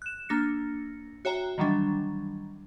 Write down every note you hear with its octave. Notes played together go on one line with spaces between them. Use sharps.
F#6 E7
A#3 D4 A#6 C#7
F#4 C#5 E5 G5 A#5
D#3 E3 F#3 G3 D4